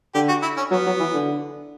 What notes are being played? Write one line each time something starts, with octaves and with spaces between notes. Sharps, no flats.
D3 G4
F#4
E4
C#4
F#3 B3
F#3
E3
D3